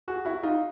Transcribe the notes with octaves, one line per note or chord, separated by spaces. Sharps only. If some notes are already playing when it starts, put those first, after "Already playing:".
F#4 G#4
E4 F#4
D#4 F4